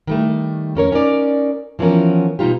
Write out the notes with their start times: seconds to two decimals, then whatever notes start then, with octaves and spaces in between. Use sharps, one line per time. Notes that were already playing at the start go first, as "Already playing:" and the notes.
0.07 D#3 G3 A3
0.75 F2 C#4 A#4 C#5
0.92 C#4 D#4 A#4 D5
1.79 E3 F3 B3 C#4 A#4
2.39 B2 G3 D#4 F4 G4